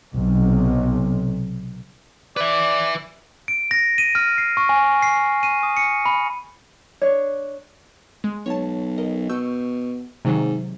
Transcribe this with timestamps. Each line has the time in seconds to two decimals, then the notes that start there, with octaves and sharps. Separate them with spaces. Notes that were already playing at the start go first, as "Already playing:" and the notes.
0.14 B1 C3
2.37 B4 D5 E5
3.48 D7
3.71 A#6
3.98 D#7
4.15 F6
4.38 C7
4.57 C#6
4.69 G#5
5.02 C7
5.43 D#7
5.63 D#6
5.77 C#7
6.06 B5
7.02 D4 C#5
8.24 G#3
8.46 B1 C#5 A5
8.98 A#4 D#5
9.29 B2 C#6 E6 G6
10.25 G#2 C3 D#3 F#3